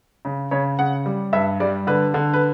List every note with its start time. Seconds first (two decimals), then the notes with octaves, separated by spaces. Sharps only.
0.25 C#3
0.51 C#3 C#5
0.79 C#3 F#5
1.06 G3
1.33 G2 E5
1.60 G3 D5
1.87 D3 B4
2.14 D3
2.34 B4